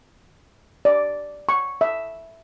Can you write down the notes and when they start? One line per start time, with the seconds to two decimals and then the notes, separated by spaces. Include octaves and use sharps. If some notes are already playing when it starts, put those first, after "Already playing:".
0.85 D5
1.49 C#6
1.81 E5